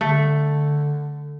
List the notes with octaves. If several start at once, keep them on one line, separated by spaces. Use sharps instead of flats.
D3 A3